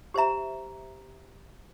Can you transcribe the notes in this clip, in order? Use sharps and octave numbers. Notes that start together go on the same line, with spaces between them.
G4 C5 E5 A#5